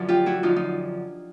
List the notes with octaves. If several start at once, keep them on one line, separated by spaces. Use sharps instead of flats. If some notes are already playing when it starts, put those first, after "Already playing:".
Already playing: F#2 D3 F3
F4 G4
E4 F#4
F#2 D3 F3 D#4 F4
D#4 F4